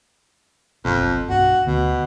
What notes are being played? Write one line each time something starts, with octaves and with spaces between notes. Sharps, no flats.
F#1 B1 F2
B1 G2 D4 F#4
D2 B2